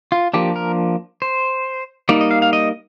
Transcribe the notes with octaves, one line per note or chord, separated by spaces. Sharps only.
F4
F3 A#3 D4 G4
A#4
C5
G3 A#3 D#4 D5
D#5
F5
F5
D#5